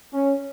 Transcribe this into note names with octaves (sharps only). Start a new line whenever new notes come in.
C#4